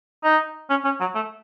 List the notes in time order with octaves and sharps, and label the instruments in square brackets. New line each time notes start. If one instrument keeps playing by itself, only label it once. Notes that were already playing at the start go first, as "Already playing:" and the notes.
[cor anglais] D#4
C#4
C#4
F#3
A3